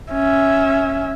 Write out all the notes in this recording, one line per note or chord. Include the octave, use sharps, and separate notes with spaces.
C#4 E5